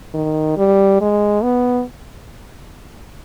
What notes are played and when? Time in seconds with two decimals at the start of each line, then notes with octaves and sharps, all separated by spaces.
0.14 D#3
0.57 G3
1.01 G#3
1.43 B3